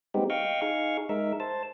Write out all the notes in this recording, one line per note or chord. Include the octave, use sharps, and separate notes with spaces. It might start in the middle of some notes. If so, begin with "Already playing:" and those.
G3 G#3 B3 C4 D#4 G4
D#5 F5 G5 C#6
D#4 G#4 F5 C#6
G#3 D#4 A#4 E5
C5 A5